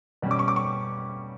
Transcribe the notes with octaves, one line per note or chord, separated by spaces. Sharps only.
B2 G3 C#4
D6
C#6
D6
C#6